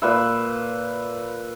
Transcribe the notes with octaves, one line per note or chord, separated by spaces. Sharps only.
A#2 B4 E5